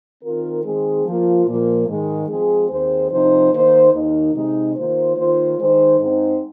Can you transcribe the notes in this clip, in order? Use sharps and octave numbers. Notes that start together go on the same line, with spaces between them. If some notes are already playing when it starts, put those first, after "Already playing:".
D#3 C4 F4 A#4
D#3 G#3 C4 G#4
F3 A#3 F4
A#2 F3 A#3
G#2 D#3 G#3
F3 G#3 C4 G#4
D#2 D#3 C4 G#4 C5
C3 F3 C4 D#4 C5
D#3 A#3 D#4 C5
D#2 D#3 A#3 D#4
C3 G#3 D#4
D#3 A#3 F4 C5
D#3 A#3 F4 C5
D#3 G#3 D#4 C5
G#2 G#3 C4 D#4 C5